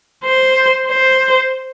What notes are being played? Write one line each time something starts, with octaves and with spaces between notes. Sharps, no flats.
C5
C5